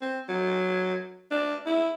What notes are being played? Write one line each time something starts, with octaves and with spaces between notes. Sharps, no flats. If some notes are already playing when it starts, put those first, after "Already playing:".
C4
F#3
D4
E4